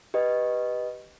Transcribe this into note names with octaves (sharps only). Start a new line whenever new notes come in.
G4 B4 D#5